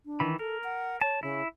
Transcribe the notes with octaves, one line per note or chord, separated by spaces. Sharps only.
D4
D#3 E3 B5
A4 A#4
F#5
C#5 A5
C#3 E4